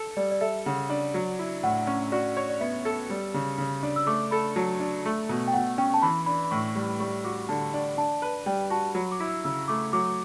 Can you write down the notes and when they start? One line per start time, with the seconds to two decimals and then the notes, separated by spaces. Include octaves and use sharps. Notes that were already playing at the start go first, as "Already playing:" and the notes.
Already playing: A4
0.17 G3 D5
0.31 D5
0.41 A4 E5
0.66 C#3 F#5
0.90 D4
1.14 F#3
1.39 E4
1.63 A2 F#5
1.87 C#4
2.12 F#4 D5
2.37 C#5
2.49 D5
2.60 B3 E5
2.85 A4
3.10 G3
3.34 C#3
3.58 C#3
3.83 D4
3.96 E6
4.07 A3 D6
4.31 A4 B5
4.56 F#3 A5
4.80 D4
5.05 A3
5.29 B2
5.48 G5
5.53 B2 F#5
5.78 C#4 G5
5.94 A5
6.02 E3 B5
6.26 D4 B5
6.44 B5
6.51 A2 C#6
6.68 C#6
6.75 G3
6.83 B5
7.00 G3 C#6
7.25 F#4 D6
7.49 D3 A5
7.74 D4
7.97 D4 A5
8.22 B4
8.46 G3 G5
8.70 F#4 A5
8.95 F#3 B5
9.12 D6
9.20 E4
9.28 E6
9.44 C#3 E6
9.68 A3 D6
9.93 F#3 D6